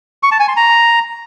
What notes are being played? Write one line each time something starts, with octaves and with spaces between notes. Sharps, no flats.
C#6
A5
G#5
C6
A#5